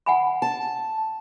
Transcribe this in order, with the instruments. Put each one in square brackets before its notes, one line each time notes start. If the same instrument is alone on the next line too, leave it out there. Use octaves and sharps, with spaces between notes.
[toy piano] F#5 G#5 B5
[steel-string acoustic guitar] A5